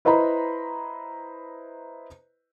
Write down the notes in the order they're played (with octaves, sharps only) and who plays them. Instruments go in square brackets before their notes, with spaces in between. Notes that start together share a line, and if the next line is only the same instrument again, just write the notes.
[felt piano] E4 B4 C5 D#5 A#5 B5